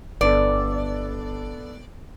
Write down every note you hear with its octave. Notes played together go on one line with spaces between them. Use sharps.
G1 B3 D4 A4 D5